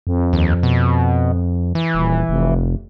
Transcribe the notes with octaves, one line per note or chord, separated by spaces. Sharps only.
F2
D#2
B2
E3
D#1
F1